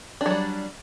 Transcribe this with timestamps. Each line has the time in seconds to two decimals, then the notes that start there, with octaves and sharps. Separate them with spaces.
0.21 D4
0.26 F#3
0.31 G3